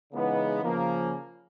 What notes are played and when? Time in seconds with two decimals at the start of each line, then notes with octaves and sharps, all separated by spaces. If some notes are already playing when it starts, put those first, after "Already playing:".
0.13 C#3 E3 G#3 B3 D#4
0.63 C#3 F3 A#3